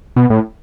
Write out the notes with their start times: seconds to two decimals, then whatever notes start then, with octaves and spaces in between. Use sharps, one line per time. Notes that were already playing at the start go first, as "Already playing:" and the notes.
0.16 B2
0.30 A2